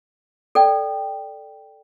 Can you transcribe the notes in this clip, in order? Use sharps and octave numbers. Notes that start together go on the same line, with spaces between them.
A4 D5 G5